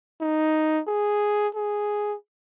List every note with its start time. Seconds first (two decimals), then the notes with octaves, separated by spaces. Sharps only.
0.21 D#4
0.88 G#4
1.55 G#4